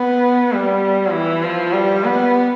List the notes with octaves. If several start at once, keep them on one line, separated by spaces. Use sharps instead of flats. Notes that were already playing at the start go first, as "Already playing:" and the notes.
Already playing: B3
G3
E3
F3
G3
B3